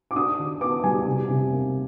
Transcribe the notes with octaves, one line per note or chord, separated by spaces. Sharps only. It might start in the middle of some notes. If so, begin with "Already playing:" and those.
D6
D4 D#6
D#3
B3 D6
G3 G#5
C3
C3
A#3